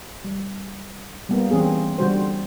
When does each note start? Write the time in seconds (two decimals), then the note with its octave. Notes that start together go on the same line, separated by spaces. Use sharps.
0.24 G3
1.29 G3 A#3 B3
1.51 E3 G3 C4 C#4 G#4
1.98 D3 G3 F#4 C5